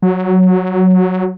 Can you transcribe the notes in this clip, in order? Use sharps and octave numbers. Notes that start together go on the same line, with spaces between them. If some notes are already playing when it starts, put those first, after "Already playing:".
F#3